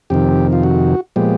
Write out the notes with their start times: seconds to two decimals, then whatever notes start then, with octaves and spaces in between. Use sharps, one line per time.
0.10 F2 C3 D#3 G4
0.53 F4
0.63 F#4
1.16 A#2 F3 G#3 B3 G4